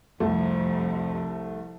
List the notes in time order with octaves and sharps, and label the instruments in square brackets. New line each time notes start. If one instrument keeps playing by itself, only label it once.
[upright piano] C2 A3 [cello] F2 C3